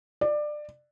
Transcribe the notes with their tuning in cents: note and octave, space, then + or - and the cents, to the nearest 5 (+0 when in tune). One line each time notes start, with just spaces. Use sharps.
D5 +20